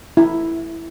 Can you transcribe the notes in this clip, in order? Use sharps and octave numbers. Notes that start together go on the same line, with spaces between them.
E4